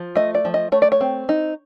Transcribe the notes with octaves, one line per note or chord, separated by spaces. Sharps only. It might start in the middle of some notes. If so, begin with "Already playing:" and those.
Already playing: F3
A3 D#5
D5
F3
D#5
A3 C#5
D5
C#5
C4
D#4